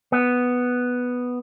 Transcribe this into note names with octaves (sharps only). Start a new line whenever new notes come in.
B3